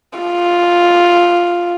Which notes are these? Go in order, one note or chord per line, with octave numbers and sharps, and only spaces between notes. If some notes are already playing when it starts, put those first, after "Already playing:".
F4